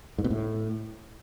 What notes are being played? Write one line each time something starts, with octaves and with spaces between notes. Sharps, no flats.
G#2
B2
A2